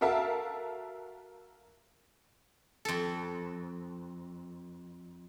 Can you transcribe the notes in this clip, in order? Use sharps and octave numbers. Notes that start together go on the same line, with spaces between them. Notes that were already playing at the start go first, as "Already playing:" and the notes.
F#4 A4 A#4 E5 F5 A5
F2 A4